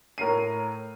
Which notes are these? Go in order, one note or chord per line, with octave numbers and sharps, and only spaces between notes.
A2 A#4 C#5 C7 D#7